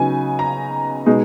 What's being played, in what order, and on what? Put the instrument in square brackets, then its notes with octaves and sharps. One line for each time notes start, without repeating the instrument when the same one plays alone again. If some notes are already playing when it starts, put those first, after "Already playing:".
Already playing: [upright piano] C#3 F#3 B3 D#4 G#5
A#5
B2 G#3 D#4